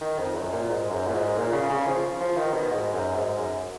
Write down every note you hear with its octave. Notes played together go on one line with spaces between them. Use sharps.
D#3
F2
F#2
A#2
G#2
F#2
A#2
G#2
A#2
C#3
C#3
F3
F3
D#3
B2
G#2
F#2
G#2
F#2